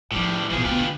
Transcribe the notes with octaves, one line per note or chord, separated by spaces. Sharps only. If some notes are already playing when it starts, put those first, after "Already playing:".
A2 D#3 F3 G3
A1 B2 E3 F3 G#4
D2 B3 F4 G4 B4
D3